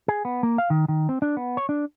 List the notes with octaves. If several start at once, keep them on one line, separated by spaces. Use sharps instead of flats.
G#4
B3
A#3
F5
D#3
D#3
C4
D4
B3
C#5
D4